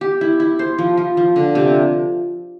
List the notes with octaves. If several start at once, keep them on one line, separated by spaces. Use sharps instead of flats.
G4
E4
E4
C5
F3
F3
F3
D3
C3